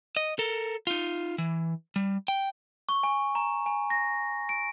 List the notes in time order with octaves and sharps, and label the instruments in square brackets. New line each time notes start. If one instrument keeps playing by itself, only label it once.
[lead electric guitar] D#5
A4 A#4
D#4 F4
E3
G3
G5
[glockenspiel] C#6
G#5
A#5
G#5
A#6
D7